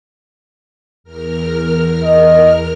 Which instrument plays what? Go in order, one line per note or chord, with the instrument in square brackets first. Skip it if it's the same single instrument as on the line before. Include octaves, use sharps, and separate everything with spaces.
[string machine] E2 A#4 F6
[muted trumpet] D#5